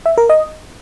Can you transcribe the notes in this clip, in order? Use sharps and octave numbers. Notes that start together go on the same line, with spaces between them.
E5
A#4
D#5